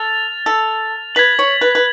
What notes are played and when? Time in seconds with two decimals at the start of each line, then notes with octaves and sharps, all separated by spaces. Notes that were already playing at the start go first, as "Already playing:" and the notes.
Already playing: A4 F6 A6 F7
0.46 A4
1.15 B4 G#6 B6 F#7
1.39 C#5
1.61 B4
1.75 B4